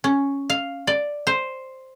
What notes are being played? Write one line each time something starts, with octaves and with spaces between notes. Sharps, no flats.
C#4
F5
D5
C5